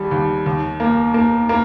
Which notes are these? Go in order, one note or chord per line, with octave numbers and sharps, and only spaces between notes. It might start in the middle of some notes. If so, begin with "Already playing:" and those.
Already playing: D#2 G3
D#2
D#2
A#3
A#3
A#3